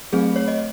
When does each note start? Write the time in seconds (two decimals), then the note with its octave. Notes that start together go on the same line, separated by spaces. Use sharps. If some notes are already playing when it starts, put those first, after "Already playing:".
0.13 F#3 A3 C4 G#4
0.36 C#5
0.48 D#5